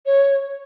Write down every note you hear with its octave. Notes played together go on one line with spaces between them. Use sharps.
C#5